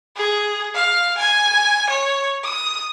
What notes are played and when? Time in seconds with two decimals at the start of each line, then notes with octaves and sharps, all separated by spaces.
0.17 G#4
0.75 F5
1.18 G#5
1.90 C#5
2.44 D#6